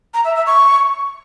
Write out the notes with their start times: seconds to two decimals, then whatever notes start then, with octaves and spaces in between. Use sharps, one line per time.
0.14 A#5
0.25 E5
0.35 E5
0.46 C#6